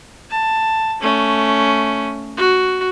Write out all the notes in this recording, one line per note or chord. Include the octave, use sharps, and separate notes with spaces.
A5
A3 C#4
F#4